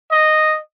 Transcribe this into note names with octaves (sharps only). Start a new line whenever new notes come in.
D#5